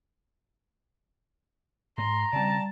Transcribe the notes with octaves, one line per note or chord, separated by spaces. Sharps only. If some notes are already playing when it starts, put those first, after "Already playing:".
G#2 A#5 C6
C#3 G3 C4 D5 A5